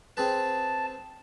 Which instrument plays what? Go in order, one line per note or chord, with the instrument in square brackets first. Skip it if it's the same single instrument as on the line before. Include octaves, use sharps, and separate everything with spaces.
[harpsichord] C4 G#4 B4 [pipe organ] A5